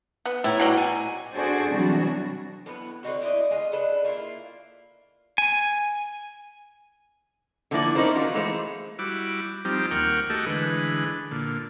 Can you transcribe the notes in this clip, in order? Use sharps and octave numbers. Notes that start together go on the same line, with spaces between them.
B3
A2 E4 A#5
B2 F#3 G3
G#5
D4 F#4 G#4 A4 C5 D5
C3 E3 F#3 G3 D4 F#4
A2 B3 B4
D3 C4 D#4 F#4
D4 E4 A4 D#5
G#3 F4 D#5
C#3 D4 A4 B4
A#3 E4 F4
G#5
D3 F3 A#3 E4 D5
C#4 D#4 A4 A#4 C5 D5
D#3 F3 F4 F#4
E3 G#3 A3 C5
G3 E4 F#4 D6
F3 G3 C4 D#4 G4
D#2 A#4 F#5 G5 C#6 F6
A3 F#4 G4 A4 D#5
D3 E3 G#3 B4
A#2 D3